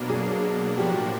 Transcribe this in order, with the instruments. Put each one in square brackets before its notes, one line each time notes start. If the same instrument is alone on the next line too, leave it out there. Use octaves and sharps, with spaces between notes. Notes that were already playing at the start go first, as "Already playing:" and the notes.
Already playing: [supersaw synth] B2 F#3 A#3 D4
[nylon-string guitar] G#4
[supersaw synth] A2 F3 A#3 D4 F#4 [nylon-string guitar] G4